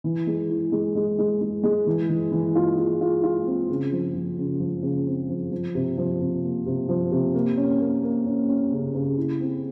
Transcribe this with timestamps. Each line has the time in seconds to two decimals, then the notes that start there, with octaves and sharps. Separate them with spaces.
0.04 E3
0.27 G#3
0.49 E4
0.72 G#3
0.96 G#3
1.19 G#3
1.41 G#3
1.64 G#3
1.87 E3
2.09 E3
2.32 E3
2.55 F4
2.78 F4
3.01 F4
3.23 F4
3.46 C4
3.70 C#3
3.92 F3
4.14 F3
4.38 C#3
4.60 F3
4.83 C#3
5.06 C4
5.29 F3
5.52 F3
5.75 C3
5.98 F3
6.20 C3
6.43 A#3
6.66 C3
6.89 F3
7.12 C3
7.35 A#3
7.57 C#4
7.80 A#3
8.03 A#3
8.26 C#4
8.48 C#4
8.72 C#3
8.94 C#3
9.17 E4
9.40 C4